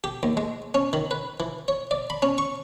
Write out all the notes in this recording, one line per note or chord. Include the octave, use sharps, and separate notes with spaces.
G4
D#2
G#3
C#4
D#3
B4
E3
C#5
D5
B5
C#4
C#6